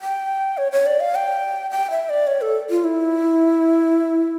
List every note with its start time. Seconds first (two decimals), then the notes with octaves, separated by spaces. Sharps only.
0.01 G5
0.57 C#5
0.72 C#5
0.86 D5
1.00 F5
1.15 G5
1.71 G5
1.90 E5
2.09 D5
2.27 C#5
2.41 A4
2.70 F4
2.84 E4